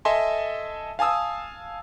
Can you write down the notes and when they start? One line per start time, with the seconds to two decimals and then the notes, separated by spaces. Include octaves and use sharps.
0.05 A4 D#5 E5 G#5 A5 C6
0.99 F5 G#5 A5 D#6 E6